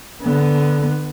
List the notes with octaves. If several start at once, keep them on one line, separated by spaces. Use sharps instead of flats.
D3 B3